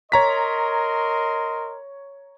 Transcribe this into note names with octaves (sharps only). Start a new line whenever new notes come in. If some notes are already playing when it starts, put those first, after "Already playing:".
A#4 C#5 D#5 A#5 C6 B6